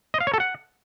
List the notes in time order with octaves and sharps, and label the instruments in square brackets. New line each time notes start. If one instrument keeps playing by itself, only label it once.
[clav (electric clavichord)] D#5
F5
C#5
A4
F#5